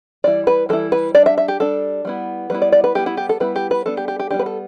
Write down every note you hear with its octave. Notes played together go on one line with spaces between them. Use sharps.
E3 G3 E4 D5
B4
E3 G3 E4 A4
B4
G3 D4 D5
E5
E5
G4
G3 D4 A4
G3 B3 E4
G3 B3 E4 B4
D5
D5
B4
G3 B3 E4 G4
E4
G4
A4
G3 B3 E4 B4
G4
B4
G3 B3 D4 A4
G4
G4
G4
G3 B3 D4 G4
B4
A4